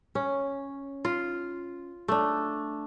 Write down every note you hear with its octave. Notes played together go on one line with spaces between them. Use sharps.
C#4
F4
A3 D4